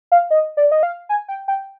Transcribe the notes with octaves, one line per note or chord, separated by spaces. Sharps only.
F5
D#5
D5
D#5
F5
G#5
G5
G5